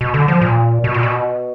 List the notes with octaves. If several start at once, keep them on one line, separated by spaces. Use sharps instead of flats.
B2
D3
F3
A#2
B2
A#2
B2